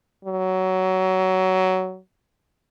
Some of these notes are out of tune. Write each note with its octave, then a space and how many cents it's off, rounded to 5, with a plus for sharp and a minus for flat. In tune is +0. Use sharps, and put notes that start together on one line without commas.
F#3 +15